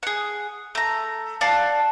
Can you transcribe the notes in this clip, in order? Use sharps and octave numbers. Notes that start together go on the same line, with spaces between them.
G#4 F#5
A3 A#5
D5 F5 F#5 A5